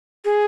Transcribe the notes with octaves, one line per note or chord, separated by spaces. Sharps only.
G#4